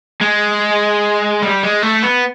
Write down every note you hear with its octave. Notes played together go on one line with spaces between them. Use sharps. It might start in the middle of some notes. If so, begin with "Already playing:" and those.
G#3
G3
G#3
A3
B3